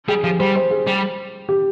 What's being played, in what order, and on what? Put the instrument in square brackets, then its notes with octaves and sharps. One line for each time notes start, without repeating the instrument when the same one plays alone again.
[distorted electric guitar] G3 [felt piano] G#4
[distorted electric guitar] F3 [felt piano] G4
[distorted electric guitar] G3 [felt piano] C5
[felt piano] C5
G#4
[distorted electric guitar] G3
[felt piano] G4